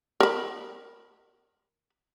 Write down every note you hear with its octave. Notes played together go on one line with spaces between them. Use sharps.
A#4 B5